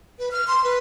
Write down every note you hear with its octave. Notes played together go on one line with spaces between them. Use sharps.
B4
F6
C6
B4